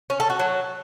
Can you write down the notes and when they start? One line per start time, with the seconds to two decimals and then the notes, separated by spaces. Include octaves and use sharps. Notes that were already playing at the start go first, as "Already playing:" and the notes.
0.10 C#4
0.20 A4
0.30 F#4
0.40 F#3